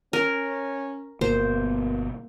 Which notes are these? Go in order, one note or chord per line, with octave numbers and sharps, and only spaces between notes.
C#4 A#4
G1 B2 A#3 B3 C5